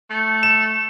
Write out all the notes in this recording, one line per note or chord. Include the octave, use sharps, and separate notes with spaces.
A3
E7